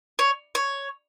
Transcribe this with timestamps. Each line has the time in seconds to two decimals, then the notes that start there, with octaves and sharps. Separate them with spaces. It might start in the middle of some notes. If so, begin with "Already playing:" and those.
0.19 C#5
0.55 C#5